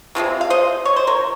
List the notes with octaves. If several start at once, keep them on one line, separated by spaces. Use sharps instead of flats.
C3 F3 G#3 C4
F5
C5 D#5
C#5
C5
A#4 C#5